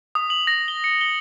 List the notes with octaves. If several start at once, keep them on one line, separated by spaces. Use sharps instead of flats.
D#6
F#7
A#6
G7
C#7
G7